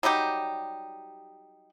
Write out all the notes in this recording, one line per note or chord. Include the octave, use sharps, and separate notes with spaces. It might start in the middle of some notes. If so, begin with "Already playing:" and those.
F#3 G3 D#4 G4